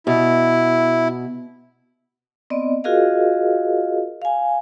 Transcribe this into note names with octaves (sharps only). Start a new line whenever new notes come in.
B2 E4
B3 C4 D5 D#5
F4 F#4 G#4 A#4 D#5 F5
F5 G#5